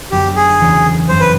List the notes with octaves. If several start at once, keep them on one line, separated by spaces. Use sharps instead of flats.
F#2 D3 F#3 B3 G4
G#4
E2 C#3 E3 A3
G1 F#2 C#3 F#3 B3 C5
B4